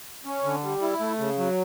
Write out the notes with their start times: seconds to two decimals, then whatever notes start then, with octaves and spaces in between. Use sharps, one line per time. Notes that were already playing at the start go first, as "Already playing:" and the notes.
0.25 C#4
0.43 D3
0.63 G3
0.82 E4
1.00 A3
1.19 C#3
1.38 F#3